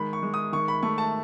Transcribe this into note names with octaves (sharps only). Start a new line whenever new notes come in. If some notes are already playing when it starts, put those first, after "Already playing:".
Already playing: D#3 G#3 B5
C#6
G#3
D#6
D#3 C#6
B5
A3 C#6
A5